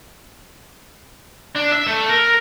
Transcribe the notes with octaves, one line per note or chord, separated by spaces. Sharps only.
D4
E5
A3
A#4